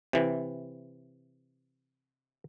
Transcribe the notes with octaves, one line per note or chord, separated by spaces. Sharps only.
C3 E3